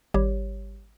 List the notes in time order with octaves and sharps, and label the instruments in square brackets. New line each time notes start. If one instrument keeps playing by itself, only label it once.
[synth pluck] G#1 G3 G4 C#5